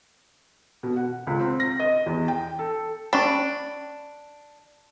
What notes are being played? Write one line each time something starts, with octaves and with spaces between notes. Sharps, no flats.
B2
F#5
C#2
C4
A#6
D#5
E2
G5
A4
C#4 D4 G5 B5